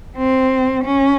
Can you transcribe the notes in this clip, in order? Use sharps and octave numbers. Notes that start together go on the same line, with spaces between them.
C4
C#4